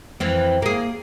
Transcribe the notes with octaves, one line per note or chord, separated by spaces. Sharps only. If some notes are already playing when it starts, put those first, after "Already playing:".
F2 E3 C4
A#3 G#4